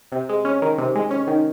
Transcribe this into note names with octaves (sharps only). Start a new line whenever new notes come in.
C3
G#3
C#4
D#3
C3
G#3
C#4
D#3